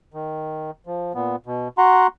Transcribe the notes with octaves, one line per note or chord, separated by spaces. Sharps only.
D#3
F3
A#2 B3
B2
F#4 F#5 A#5 C6